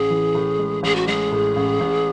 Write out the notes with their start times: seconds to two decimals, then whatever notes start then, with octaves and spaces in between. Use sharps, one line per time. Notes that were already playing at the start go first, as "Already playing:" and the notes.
Already playing: A1 G#4
0.10 E3
0.35 A2
0.59 G#3
0.83 A1 G#4
0.96 F#4
1.07 G#3 G#4
1.31 A2
1.56 A1
1.80 A1